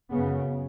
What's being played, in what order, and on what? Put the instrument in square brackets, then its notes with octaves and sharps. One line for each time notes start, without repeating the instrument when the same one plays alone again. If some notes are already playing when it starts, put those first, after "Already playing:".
[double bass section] F#2 C#3 B3